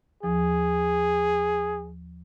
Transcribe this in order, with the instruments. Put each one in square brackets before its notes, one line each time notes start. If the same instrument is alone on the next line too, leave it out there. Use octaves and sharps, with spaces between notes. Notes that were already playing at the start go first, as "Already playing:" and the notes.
[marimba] D#2 F3 [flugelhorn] G#4